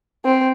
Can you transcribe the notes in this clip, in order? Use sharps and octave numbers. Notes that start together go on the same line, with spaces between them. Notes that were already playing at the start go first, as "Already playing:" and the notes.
C4